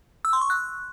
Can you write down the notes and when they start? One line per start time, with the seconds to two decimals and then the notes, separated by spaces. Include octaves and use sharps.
0.25 E6
0.33 C6
0.41 C#6
0.50 F#6